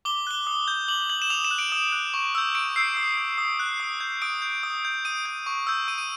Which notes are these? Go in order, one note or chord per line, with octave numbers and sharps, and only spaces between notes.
D6 G7
F#6 G7
D#6
G6
D6 F#7
G6 F#7
E7
D#6 F7
E7
F#6
D7
D#6
F#6
C#6
E6 G6
C#6 D7
E6 G6 C7
D#6
G6
D#6
F#6
D#6
G6
D#6 D7
G6
D#6
G6
D#6 D#7
G6
C#6
E6 G6
D#6 D#7
D#7